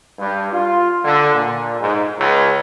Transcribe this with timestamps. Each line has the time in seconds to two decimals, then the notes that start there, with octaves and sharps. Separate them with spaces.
0.19 G2
0.52 F4
1.05 D3
1.34 A#2
1.80 G#2
2.18 C#2